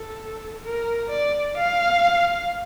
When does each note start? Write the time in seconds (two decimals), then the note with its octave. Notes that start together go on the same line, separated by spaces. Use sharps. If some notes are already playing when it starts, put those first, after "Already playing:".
Already playing: A4
0.64 A#4
1.11 D5
1.58 F5